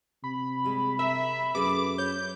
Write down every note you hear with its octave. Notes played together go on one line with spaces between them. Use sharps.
C3 B5
G3 G#3
A#4 E5
F#2 G#4 A4 B4 D6
C#5 G6